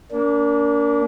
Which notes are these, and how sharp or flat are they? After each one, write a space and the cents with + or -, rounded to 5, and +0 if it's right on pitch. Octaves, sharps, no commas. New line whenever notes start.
A#3 +0 D4 -35